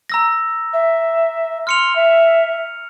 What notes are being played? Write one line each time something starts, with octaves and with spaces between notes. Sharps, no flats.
A#5 E6 A#6
E5
C6 F6 C#7 F7
E5